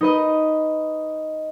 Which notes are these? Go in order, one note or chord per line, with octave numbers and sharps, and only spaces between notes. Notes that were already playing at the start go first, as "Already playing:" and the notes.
D#4 B4 D#5